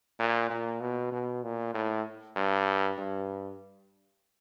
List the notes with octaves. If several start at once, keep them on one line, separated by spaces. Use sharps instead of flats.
A#2
A#2
B2
B2
A#2
A2
G2
G2